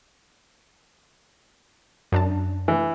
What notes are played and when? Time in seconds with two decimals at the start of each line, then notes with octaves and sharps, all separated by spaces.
2.12 F#2 D4 A5
2.68 E3